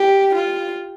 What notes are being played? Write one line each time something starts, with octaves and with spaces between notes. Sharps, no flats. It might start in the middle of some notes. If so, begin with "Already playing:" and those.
Already playing: G4
F4